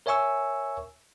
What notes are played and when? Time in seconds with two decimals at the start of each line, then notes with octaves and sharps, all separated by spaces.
0.06 A#4 C#5 E5 G#5 C#6 E6